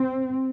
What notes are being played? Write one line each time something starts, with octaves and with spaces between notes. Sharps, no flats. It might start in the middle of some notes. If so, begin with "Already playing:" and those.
Already playing: C4